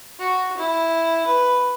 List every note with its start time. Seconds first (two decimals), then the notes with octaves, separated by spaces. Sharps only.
0.19 F#4
0.57 E4
1.27 B4